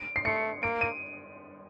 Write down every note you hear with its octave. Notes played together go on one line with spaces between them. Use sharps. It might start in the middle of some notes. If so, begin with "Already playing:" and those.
Already playing: D7
C7
A3 C#7
A#3 D7
D#7